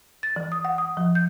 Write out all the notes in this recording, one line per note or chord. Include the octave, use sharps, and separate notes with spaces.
A6
E3
D#6
F#5
D#6
F3
G6